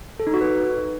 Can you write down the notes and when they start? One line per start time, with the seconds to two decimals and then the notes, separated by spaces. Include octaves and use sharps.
0.20 A4
0.27 D#4
0.34 F#4
0.41 B4